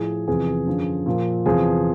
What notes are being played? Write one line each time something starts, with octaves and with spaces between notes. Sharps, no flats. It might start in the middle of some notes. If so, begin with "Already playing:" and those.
Already playing: A2 F3 G#4
E2 C3 F3 G#4
F#2 D3 F3
A#2 F3
E2 C3 F3 G#4